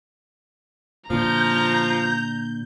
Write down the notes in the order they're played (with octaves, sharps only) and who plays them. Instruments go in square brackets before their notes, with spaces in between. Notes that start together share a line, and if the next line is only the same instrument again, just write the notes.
[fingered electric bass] A#2 D3 [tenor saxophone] F3 [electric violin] A#5 [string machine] G6